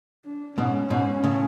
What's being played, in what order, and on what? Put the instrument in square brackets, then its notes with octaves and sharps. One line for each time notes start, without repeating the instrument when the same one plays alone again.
[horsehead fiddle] D4
[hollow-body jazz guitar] G#2 B2 [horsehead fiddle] C#4
[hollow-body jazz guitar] G#2 B2
A2 C#3